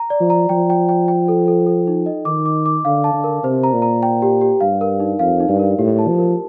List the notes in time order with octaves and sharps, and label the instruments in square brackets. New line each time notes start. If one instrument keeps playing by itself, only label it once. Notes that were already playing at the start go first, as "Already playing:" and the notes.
Already playing: [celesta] A#5
D5
[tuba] F3
[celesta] A#5
[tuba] F3 [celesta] G5
[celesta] G5
G5
G5
A4
A4
A4
D#4
D#5
[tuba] D#3 [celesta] D6
[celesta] D6
D6
[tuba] D3 [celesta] F5
[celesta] A5
[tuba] D3
[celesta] A#4
[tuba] C3 [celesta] C5
[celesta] A#5
[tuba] A#2
[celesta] A#5
G5
G4
G4
[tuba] G2 [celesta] F5
[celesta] A#4
D#4
[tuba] F2 [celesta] F5
[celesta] D#4
[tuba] G2
[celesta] A#4
[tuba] A2 [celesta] G4
[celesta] A5
[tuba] F3
[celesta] A#4